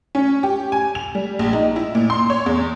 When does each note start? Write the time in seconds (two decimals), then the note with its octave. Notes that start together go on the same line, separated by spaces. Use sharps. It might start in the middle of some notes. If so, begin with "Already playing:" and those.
0.15 C#4
0.43 G4
0.72 G#5
0.95 F7
1.15 G3
1.39 A#1
1.53 D#4
1.76 E4
1.95 A#2
2.10 C6
2.30 C#5
2.46 E2